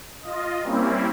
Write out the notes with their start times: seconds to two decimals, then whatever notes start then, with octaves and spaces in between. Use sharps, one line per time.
0.23 F4 D#5
0.62 G3 A#3 C4 C#4 E4